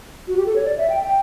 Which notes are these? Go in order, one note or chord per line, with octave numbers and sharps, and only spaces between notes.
F#4
G4
A4
C#5
D5
E5
G5
G5